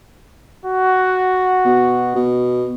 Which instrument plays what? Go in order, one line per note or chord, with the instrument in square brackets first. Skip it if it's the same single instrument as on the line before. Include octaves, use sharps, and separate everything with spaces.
[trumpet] F#4
[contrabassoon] B2
B2